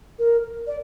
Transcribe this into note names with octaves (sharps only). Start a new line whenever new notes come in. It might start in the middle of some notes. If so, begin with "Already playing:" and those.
A#4
D5